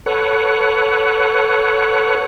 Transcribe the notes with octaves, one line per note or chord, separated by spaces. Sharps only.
A4 B4 C#5 F#5